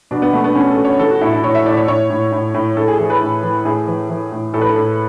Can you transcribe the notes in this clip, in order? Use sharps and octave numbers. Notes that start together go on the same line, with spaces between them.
B2 D4
B3
B2 A3
B3
B2 C#4
A4
B2
C#5
E3 A4
F#4
A2 E4
E4
A2 C#5
E5
A2 D5
C#5
A2 C#5
A2
A2
A2
A2 A4
G#4
E3 G#4
B4
A2
E3
A2 G#4
E3
E3
A2
A2 A4
B4
A4
A2